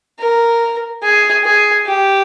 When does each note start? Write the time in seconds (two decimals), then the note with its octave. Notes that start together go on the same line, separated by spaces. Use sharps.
0.19 A#4
1.03 G#4
1.44 G#4
1.86 G4